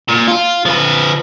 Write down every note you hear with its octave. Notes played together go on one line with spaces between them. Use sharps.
A#2
F4
F3 B4